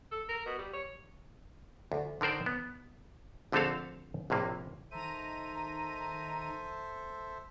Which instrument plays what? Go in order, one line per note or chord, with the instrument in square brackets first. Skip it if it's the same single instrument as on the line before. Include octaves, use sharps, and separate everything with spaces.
[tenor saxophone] A4
A#4
B2
G3
C#5
[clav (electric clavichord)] D2
D3 D#3 A#4 C5 D5
B3
A#1 D3 A3 C4 A4 F5
A#1 A2 C3 A#3
[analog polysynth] D#3 A#5 D#7 [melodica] A4 C5 E5